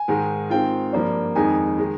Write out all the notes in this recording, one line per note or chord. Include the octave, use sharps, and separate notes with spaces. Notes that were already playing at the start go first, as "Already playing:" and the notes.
Already playing: G#5
G#2 D#3 G#3
D#3 G#3 C4 F4 G5
G2 F3 A#3 D4
F2 D#3 G#3 D#4 G#5
D#3 G#3